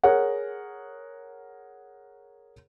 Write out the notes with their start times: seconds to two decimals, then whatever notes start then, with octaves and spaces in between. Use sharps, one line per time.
0.04 G#4 A#4 C#5 F#5